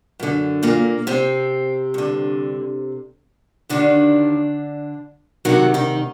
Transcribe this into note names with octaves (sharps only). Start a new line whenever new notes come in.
F#2 D3
A#2 A#3
C3 C4
G2 D3
D#2 D3 D#3 D4
D2 C3 D#3 F#3 F#4
D#3 D#4